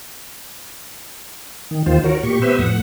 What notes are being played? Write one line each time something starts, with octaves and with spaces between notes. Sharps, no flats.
D#3
D#2 D#3 F4 C5
F#4 A#4 C#5
A#2 G4 C#6
B3 G4 B4 C5 E5
F2 A2 F#5